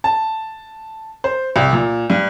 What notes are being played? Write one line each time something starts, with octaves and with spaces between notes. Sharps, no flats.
A5
C5
C2
A#2
G2